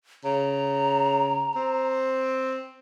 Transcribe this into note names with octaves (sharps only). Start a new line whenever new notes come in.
C#3 A#5
C4